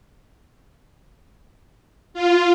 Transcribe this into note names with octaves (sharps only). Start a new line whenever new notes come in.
F4